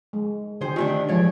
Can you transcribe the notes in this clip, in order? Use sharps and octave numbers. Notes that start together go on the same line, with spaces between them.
G#3
D3 G4 G#4 C5
D#3 A3 D4 F4
E3 F3 G#3 C#5 D5